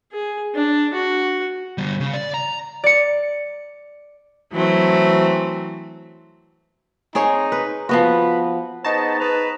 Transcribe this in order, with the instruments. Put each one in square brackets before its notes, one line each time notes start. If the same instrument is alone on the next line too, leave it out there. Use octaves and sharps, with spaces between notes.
[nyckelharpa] G#4
D4
F#4
[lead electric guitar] D3 G3
C#3
D5
A#5
[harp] D5 C#7
[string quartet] E3 F#3 A3 C4
[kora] C4 G#4 C#5 [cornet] D#4
[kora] B4
[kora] F3 B3 F#4 [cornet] B4
[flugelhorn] B3 [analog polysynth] D#4 A5 [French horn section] G#4 C5 [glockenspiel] A#5 C#6 A#6
[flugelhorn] B4 [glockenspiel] D#6 E7 F7